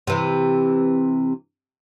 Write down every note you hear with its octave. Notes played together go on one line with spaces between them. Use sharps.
C3 E3